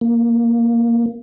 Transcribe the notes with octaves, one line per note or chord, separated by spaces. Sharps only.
A#3